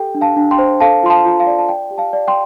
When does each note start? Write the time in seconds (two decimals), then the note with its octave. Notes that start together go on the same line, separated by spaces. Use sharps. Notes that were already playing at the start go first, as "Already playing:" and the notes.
Already playing: G4 A4 G5
0.15 D4
0.21 F5 A5
0.36 D4
0.51 G5 C6
0.58 C5
0.80 A4 F5 A5
1.03 F4 C6
1.10 F5 A5
1.25 F4
1.40 F5
1.47 D5
1.58 A5
1.69 D5 G5
1.91 G4
1.98 F5 A5
2.13 D5
2.28 G5 C6